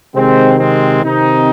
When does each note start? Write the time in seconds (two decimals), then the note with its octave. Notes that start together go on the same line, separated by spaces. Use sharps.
0.15 C3 D#3 G#3 C4
0.60 G#3 C4
1.04 C3 D#3 C4 D#4